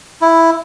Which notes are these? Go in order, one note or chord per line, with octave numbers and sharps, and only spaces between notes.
E4